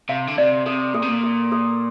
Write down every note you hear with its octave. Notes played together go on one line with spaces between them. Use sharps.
C3 F5
D3
C3 D5
C3 A4
A#2 A4
C3
A#2
A4
A4